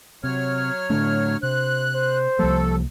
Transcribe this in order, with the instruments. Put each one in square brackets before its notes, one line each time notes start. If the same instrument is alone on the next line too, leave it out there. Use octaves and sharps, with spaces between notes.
[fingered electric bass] C3 [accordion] F#3 C#5 F6
[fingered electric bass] A2 D3 A3 [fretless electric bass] D4
[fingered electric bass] C3 [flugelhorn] C5 [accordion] F#6
[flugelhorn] C5
[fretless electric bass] C2 A#3 [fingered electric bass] F3 G3 [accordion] A3 A4